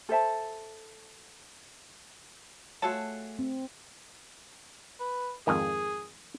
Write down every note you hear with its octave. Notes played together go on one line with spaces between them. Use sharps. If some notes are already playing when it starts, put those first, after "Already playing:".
A4 C5 E5 A5
A3 F4 F#4 G#4 A4 C#5 A5
C4
B4
F2 G#2 D#3 G#4